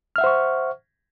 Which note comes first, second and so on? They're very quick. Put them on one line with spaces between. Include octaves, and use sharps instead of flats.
F6 E5 F#5 C5 C#6